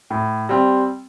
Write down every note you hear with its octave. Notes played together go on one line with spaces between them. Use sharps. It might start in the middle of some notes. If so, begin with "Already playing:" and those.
A2
G3 C4